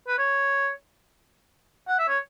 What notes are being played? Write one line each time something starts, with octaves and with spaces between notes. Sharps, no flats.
B4
C#5
F#5
E5
C#5